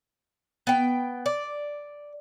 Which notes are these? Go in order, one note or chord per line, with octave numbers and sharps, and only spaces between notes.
B3 G5
D5